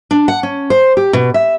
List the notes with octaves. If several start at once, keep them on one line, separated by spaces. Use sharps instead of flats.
D4
F#5
C#4
C5
G4
B2
E5